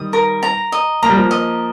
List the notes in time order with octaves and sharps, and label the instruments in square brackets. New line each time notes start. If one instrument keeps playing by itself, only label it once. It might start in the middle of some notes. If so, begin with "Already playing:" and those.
Already playing: [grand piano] D#3 G3 [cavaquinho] D#6
[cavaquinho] A#4
A#5
D#5
[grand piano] A#3 [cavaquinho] A#5
[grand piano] G3
F3 A#3
[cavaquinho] D#5